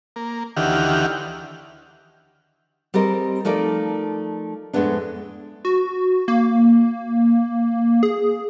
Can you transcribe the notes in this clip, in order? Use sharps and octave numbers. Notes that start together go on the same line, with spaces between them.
A#3
D2 D#3 E3 G4 F#5 F6
G3 C4 G#4 A#4 D#5
F3 A3 D#4 A#4 D5
F2 A2 G#3 A3 B3 D4
F#4
A#3
G#4